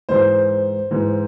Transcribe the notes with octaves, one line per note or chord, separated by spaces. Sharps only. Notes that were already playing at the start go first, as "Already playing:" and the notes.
G#2 E3 C5
G#2 E3